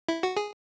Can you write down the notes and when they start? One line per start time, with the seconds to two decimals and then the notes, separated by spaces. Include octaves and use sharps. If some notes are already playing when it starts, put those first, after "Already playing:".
0.09 E4
0.23 F#4
0.37 G#4